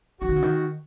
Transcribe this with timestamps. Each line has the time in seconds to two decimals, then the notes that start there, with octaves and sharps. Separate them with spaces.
0.21 E3 F#4
0.29 D#3
0.36 C#3
0.42 D#3